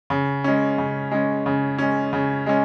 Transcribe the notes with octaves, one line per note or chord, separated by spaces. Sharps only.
C#3
G#3 C#4
C#3
G#3 C#4
C#3
G#3 C#4
C#3
G#3 C#4